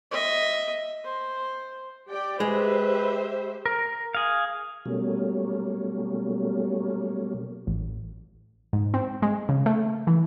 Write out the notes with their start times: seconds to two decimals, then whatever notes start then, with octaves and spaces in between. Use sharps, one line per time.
0.11 D#5 E5
1.05 C5
2.09 G4 D5 G5
2.40 G#3 G4 B4 C5 E5
3.66 A#4
4.15 G#4 F5
4.86 B2 F#3 G3 A3 A#3 C#4
7.67 A1
8.73 G#2
8.94 C4
9.22 G#3
9.49 C#3
9.66 A3
10.07 E3